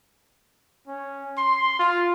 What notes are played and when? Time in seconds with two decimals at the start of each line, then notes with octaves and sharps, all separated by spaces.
0.87 C#4
1.38 C6
1.79 F4